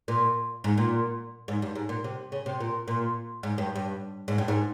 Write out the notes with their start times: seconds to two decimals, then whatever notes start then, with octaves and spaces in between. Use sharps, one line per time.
0.08 A#2
0.64 G#2
0.78 A#2
1.48 G#2
1.62 G2
1.75 G#2
1.89 A#2
2.04 C3
2.32 C#3
2.46 C3
2.60 A#2
2.88 A#2
3.43 G#2
3.58 G2
3.76 G2
4.28 G#2
4.38 G2
4.48 G#2